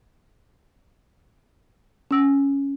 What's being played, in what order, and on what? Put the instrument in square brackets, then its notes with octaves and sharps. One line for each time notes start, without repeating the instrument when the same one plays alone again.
[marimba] C#4 E6